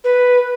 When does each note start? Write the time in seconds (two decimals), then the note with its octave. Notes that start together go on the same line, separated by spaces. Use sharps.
0.04 B4